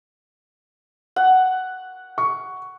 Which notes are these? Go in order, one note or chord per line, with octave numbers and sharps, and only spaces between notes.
F#5
C#6